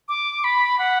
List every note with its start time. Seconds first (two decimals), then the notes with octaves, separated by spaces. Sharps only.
0.08 D6
0.44 B5
0.79 F#5